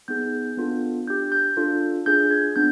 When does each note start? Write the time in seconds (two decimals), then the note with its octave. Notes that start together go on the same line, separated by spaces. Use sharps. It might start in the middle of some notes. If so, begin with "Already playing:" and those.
0.08 B3 D#4 G#4 G6
0.57 B3 D4 F4 A4
1.07 D4 G4 G6
1.32 G6
1.57 D4 F4 A4
2.06 D4 F4 G#4 G6
2.31 G#6
2.56 B3 D4 G6